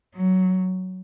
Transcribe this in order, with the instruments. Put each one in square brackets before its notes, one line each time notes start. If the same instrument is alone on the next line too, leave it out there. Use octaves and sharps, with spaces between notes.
[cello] F#3